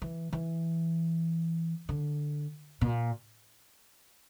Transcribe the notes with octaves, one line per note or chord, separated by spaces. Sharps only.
E3
E3
D3
A#2